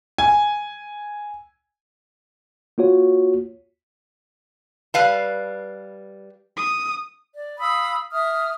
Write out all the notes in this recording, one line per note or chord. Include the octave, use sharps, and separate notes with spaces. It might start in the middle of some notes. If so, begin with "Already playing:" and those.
G#5
A#3 F4 F#4 C#5
G3 B4 F5 A5
D#6
D5
F5 B5 D#6 E6
E5 D#6 F6